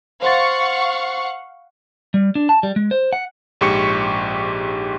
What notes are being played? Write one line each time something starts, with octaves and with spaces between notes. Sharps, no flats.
C5 F5 F#5 C6 C#6 A6
G3
D4
A5
G3
G#3
C5
F#5
A#1 G#2 G4 C#6 C#7